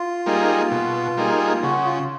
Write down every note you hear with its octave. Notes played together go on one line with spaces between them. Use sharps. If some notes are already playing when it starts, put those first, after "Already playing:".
Already playing: F4
G3 A#3 D#4 G#4
B2
G3 A#3 D#4 G#4
C#3 F#4
F4